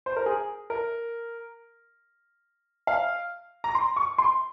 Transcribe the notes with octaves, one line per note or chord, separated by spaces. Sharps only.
C5
A#4
G#4
A#4
F5
A#5
C6
C#6
C6